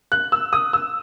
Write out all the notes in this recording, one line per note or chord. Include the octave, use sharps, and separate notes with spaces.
F#6
E6
D#6
E6